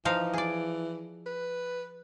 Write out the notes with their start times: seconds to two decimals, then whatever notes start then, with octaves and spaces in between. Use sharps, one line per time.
0.05 E3 F3 D#4 F5
0.33 G#4 D5
1.26 B4